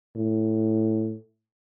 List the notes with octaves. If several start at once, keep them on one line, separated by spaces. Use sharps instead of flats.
A2